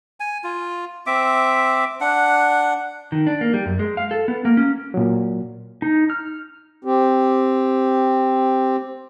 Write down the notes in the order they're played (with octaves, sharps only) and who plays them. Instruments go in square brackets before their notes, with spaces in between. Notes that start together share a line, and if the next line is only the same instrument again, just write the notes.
[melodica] G#5
F4
C4 E5 D6
D4 F#5
[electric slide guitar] D#3
D4
A#3
G3
F#2
G#3
F5
A4
B3
A#3
C#4
[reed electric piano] A#2 F#3
[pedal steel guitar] D#4
F6
[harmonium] C4 G4